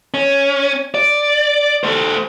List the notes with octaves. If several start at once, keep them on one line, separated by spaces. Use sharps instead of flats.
C#4
D5
A3 C5